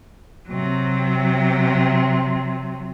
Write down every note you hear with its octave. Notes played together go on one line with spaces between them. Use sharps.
C3 F#3